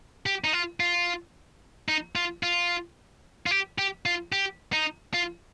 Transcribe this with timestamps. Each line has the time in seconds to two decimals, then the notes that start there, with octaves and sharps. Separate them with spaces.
0.26 G4
0.44 D#4
0.53 F4
0.80 F4
1.88 D#4
2.15 F4
2.43 F4
3.46 F4
3.51 G4
3.78 G4
4.06 F4
4.32 G4
4.73 D#4
5.14 F4